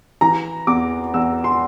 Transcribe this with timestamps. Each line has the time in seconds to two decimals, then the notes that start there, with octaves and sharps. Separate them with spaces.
0.21 E3 A#5
0.67 E2 D6
1.14 E2 E6
1.44 C6